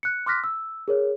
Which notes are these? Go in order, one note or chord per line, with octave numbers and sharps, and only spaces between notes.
F#6 C#7
C6 D6 F6 F#6 A#6 B6
E6
G#4 A#4 C#5